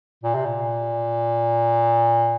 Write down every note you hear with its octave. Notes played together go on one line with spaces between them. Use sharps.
A#2
C3
A#2